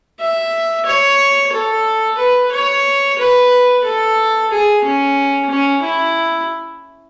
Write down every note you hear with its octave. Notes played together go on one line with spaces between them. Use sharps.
E5
C#5
A4
B4
C#5
B4
A4
G#4
C#4
C#4
E4